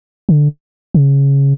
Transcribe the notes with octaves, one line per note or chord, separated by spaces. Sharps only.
D3
C#3